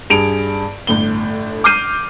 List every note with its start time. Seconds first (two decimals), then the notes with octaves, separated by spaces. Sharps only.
0.10 G2 G#4 D7 F7
0.87 G1 A2 G7
1.64 D6 F6 G6 C7 D#7